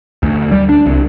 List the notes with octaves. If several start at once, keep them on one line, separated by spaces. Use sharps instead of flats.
D2
G3
D4
C2